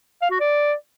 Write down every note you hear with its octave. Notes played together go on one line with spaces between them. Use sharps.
F5
F#4
D5